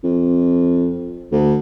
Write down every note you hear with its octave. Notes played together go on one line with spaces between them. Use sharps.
F2
D2